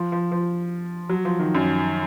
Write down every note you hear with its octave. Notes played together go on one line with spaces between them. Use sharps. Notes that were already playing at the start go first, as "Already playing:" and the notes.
Already playing: F3
F3
F3
F#3
F3
D#3
F#2